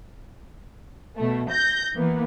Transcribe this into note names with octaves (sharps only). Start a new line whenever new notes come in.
B2 A3
G6 A#6
E3 A#3 B3